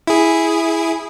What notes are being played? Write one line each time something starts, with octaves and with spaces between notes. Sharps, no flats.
E4 G#4